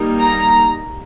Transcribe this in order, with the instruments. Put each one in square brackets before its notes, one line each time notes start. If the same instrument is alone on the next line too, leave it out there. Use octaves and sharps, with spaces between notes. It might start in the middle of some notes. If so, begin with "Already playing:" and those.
Already playing: [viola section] G3 A#3 D#4
A#5